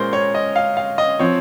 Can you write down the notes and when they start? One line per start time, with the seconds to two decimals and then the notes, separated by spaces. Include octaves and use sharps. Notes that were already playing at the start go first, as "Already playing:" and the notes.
Already playing: A#2 G#3 C#4 A#4 C5
0.13 C#5
0.35 D#5
0.56 F5
0.77 F5
0.98 D#5
1.19 F3 C4 C#5